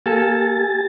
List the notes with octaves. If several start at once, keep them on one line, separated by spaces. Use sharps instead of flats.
A#3 G4 A4 G#5 A6